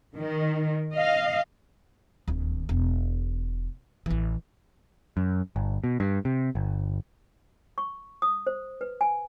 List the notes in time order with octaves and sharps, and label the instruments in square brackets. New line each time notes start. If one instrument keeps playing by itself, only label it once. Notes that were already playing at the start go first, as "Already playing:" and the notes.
[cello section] D#3
D#5 F5
[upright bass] D1 D#2
E1
A1 E3
[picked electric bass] F#2
G1
B2
G2
C3
G1
[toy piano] C#6
D#6
C5
B4
G#5